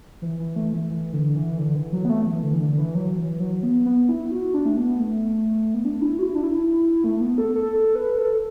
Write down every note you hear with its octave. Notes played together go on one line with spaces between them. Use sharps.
E3
E3
A3
E3
E3
D3
E3
D3
E3
F#3
B3
A3
E3
D3
E3
D3
E3
F#3
E3
F#3
B3
B3
E4
F#4
D4
A3
B3
A3
B3
D4
E4
F#4
E4
D4
E4
A3
A3
B3
A4
A4
A4
B4
A4